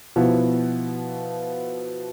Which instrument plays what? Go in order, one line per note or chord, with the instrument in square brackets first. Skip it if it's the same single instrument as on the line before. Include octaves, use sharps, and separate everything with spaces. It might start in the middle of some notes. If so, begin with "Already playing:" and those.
[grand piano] B2 F3 B3 E4